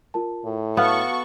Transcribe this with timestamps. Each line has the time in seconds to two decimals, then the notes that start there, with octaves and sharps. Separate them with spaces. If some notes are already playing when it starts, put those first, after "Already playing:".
0.14 F4 A#4 A5
0.45 A2
0.77 B3 F#4 A4 F5 F#5 C#6 F6